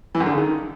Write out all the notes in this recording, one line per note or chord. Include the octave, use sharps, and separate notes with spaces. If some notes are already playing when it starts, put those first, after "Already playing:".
E3
F#2
D3
C#3
D#3